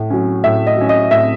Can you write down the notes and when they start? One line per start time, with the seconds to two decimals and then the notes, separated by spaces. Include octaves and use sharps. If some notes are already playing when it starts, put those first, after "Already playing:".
Already playing: A2
0.10 F#3 C#4
0.44 A2 E5
0.67 D#5
0.77 F#3 C#4
0.89 D#5
1.11 A2 E5